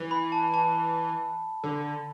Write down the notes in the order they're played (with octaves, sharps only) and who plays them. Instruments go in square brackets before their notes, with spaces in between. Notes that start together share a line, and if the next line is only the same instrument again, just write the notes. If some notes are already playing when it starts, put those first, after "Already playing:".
Already playing: [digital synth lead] E3
[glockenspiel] B5
A5
A5
[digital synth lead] D3